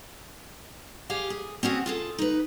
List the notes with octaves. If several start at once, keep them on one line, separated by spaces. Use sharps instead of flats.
G4 G#4 F5
G#4
C4 C#4 F#4 G#4
F4 G#4 A4
D#4 B4